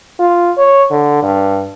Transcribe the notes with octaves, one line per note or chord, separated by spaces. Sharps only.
F4
C#5
D3
G2